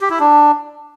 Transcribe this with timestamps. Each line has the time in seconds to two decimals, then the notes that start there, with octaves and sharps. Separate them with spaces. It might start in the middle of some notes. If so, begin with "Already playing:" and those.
0.01 G4
0.10 E4
0.20 D4